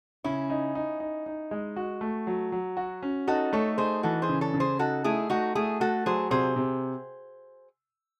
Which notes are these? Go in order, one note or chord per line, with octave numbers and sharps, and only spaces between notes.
C#3 C#4 E4
D#4
D#4
D#4
D#4
G#3
F#4
A3
F#3
F#3
F#4
C#4
D#4 F#4 A4
A3 A4 C#5
D#4 G#4 C5
E3 F#4 A4
G#4 C5
C#3
A4 C#5
C#3
G#4 C5
D#4 F#4 A4
A3 E4 G#4
A3 D#4 F#4
A3 E4 G#4
A3 F#4 A4
F#3 G#4 C5
C3 G#4 C5
C3